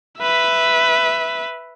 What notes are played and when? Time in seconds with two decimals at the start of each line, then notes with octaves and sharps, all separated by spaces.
0.19 B4 E5